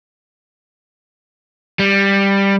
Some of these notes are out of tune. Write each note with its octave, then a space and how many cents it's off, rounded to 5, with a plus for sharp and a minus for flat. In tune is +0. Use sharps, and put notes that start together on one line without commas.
G3 +10